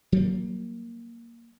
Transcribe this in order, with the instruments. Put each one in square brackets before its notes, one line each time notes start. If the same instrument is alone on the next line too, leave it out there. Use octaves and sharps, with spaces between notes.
[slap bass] F#3 G3 A#3